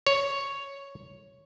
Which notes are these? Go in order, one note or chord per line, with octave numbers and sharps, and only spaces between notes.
C#5